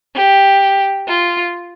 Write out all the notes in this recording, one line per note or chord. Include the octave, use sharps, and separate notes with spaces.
G4
F4